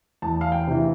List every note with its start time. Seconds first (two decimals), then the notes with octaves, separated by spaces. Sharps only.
0.22 E2 A5
0.41 F5
0.52 G5
0.67 C3 E3